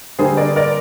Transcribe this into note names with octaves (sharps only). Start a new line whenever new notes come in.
D3 G3 A#3 G#4 C5
A#4 D5
A#4 D5